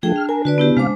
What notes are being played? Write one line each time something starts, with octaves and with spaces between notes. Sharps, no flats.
F3 A3 D4 G#4 G5
F6
A#4 G#5
D3 F#4 B4 D5
B3 E4 G4
C3 G#3 C5 F5 D6